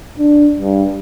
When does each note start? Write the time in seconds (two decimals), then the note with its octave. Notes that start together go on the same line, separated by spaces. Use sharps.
0.19 D4
0.59 G2